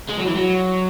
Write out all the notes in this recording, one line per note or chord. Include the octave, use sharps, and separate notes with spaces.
G#3
F#3
E3
F#3